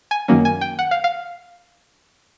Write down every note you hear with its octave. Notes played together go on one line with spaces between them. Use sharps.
G#5
F#2 D#3 F#3 A#3 C#4
G#5
G5
F#5
F5
F5